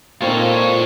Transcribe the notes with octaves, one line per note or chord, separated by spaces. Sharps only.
A#2 C4 D#4 F4 A4 C#5